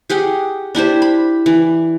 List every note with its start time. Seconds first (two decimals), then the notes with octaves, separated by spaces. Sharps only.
0.10 G4 G#4 F#5 G5
0.75 D4 E4 G4 C5
1.02 B5
1.46 E3